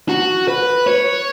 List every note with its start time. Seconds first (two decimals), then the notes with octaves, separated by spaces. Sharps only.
0.09 F#4
0.48 B4
0.87 C#5